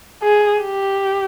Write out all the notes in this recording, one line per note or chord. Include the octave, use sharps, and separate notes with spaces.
G#4
G4